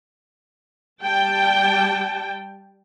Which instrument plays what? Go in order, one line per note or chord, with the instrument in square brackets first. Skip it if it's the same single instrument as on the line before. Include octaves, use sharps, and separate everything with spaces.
[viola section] G3 G5 A5